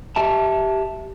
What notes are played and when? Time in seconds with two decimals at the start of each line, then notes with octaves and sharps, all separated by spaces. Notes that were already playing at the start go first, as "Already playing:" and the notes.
0.16 G4 E5 A5